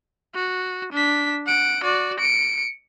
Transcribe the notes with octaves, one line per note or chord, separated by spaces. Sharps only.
F#4
D4 B6
F#5 D7
F#4 D5
C#7 D7